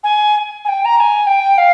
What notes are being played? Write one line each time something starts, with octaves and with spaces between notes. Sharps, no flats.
G#5
G#5
G5
A#5
A#5
G#5
G5
F5